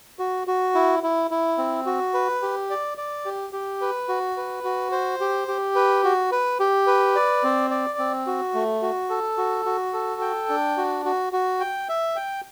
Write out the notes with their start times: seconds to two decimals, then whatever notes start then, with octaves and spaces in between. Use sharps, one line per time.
0.19 F#4
0.47 F#4
0.75 E4
1.03 E4
1.31 E4
1.58 C4
1.86 F#4
2.14 B4
2.42 G4
2.70 D5
2.98 D5
3.25 G4
3.53 G4
3.81 B4
4.08 F#4
4.37 B4
4.64 F#4
4.92 C5
5.20 G4
5.48 G4
5.75 B4
6.04 F#4
6.32 B4
6.60 G4
6.87 B4
7.15 D5
7.43 C4
7.70 D5
7.99 C4
8.27 F#4
8.54 A3
8.82 F#4
9.10 A4
9.37 F#4
9.66 F#4
9.93 A4
10.21 G5
10.49 D4
10.78 F#4
11.05 F#4
11.33 F#4
11.60 G5
11.89 E5
12.16 G5